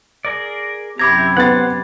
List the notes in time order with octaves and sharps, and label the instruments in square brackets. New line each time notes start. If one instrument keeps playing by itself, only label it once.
[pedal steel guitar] G#4 A#4 D5
[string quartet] F#2 C3 [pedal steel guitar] E4 C5 A#5 [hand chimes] B5 D6 G#6
[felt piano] B3 A6 [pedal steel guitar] C5 F#5